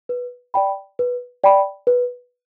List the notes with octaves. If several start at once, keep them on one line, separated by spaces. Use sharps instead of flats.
B4
D5 G5 B5
B4
D5 G5 B5
B4